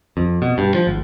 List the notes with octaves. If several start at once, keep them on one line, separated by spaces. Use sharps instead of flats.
F2
B2
G2
F3
G#1